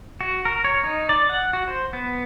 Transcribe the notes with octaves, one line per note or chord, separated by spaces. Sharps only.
F#4
A#4
C#5
D#4
D5
F#5
F#4
C5
B3